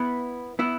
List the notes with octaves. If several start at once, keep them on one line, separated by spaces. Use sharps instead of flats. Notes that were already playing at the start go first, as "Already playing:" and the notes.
Already playing: B3 E4
B3 E4